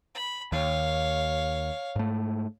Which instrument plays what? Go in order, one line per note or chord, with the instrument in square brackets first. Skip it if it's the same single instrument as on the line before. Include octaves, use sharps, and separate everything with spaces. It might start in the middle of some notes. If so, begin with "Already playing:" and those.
[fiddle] B5
[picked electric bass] D#2 [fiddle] C#5 F5
[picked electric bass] G#2 A3